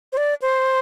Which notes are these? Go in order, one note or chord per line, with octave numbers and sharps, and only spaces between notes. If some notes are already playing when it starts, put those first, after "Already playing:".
C5
D5
C5